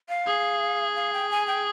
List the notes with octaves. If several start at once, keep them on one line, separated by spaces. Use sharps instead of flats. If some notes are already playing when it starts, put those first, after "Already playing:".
F5
G#4
F5
G5
G#5
G5